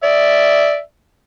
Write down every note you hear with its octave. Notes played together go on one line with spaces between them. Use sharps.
D5 E5